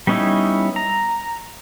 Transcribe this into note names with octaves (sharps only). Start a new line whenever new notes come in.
G3 B3 C#4 D#4 E4
A#5